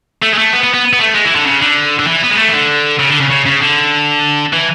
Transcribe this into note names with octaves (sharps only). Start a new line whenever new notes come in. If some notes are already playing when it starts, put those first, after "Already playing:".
A3
G#3
A3
B3
B3
B3
B3
A3
G#3
E3
D3
C#3
D3
D3
E3
B3
G#3
A3
E3
D3
C#3
D3
C#3
C#3
C#3
D3
E3